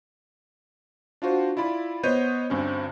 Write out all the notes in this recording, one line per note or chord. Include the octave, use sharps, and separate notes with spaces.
D4 F4 F#4 C5
E4 F4 D5 B5
B3 C5 C#5 D#5 G6 D#7
D2 G2 C4 C#4